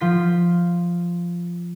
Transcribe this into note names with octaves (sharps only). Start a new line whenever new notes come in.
F3 F4 B6